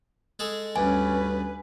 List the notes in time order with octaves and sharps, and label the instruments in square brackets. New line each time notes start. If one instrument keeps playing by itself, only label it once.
[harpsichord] G#3 G#4 A4
[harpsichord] D2 G2 [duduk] C#4 [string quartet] B4 [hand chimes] G#5